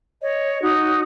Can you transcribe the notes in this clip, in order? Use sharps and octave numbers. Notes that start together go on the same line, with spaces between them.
C#5 D#5
D#4 F#4